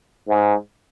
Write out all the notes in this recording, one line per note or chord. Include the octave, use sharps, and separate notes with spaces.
G#2